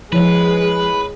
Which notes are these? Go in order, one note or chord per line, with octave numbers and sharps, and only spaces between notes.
F3 G#3 E4 G#4 B4 C#5